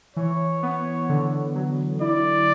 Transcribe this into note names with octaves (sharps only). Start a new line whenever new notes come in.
E3 C#5
B3
D3
F#3
E4 D5